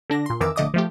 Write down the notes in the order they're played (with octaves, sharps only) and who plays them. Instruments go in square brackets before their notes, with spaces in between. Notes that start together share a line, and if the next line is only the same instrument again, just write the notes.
[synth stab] D3 D4 A#6
A#2 C6
F2 D#3 E3 A#4 D6 E6
A#1 D3 A3 D#5 D6 D#6
F3 A3 G4